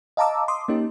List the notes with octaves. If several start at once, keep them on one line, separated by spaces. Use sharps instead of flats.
D#5 F5 A5 A#5 D6 E6
C6 D6 D#6
A#3 C#4 D#4 G4